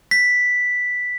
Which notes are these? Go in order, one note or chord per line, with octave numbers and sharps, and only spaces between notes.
B6